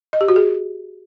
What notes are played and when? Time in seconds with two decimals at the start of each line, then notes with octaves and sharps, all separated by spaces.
0.13 D#5
0.21 G4
0.28 F#4
0.36 G#4